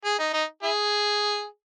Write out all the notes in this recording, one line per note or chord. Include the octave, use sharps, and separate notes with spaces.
G#4
D#4
D#4
E4 G#4